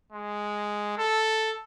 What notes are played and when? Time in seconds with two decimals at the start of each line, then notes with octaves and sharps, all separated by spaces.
0.12 G#3
0.99 A4